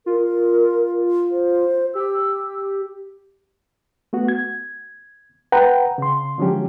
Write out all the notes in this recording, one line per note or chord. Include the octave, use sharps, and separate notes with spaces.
F4 A#4
C5
G4 E6
A3 B3 F#4
G#6
B4 F#5 G5 A#5
C#3 C6
D3 F3 F#3 G#3 C#4 G4